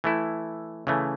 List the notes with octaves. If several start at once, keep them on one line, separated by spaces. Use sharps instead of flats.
E3 A3 E4
C#3 E3 A3